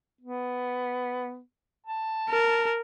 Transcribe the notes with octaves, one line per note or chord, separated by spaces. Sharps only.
B3
A5
A#4